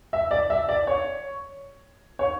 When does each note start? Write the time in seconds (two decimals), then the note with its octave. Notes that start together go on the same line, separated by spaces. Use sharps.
0.13 E5
0.31 D5
0.50 E5
0.69 D5
0.87 C#5
2.19 C#5